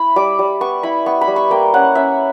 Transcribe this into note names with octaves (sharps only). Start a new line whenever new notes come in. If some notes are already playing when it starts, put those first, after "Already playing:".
Already playing: E4 B5
G3 D6
G3
B3 C#6
E4 B5
B3 C#6
B5
G3
C#6
A#3 G5
C#4 F#5
C#4 E5